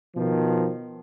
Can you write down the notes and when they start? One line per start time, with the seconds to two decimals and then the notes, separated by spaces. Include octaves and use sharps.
0.17 B2 D#3 F3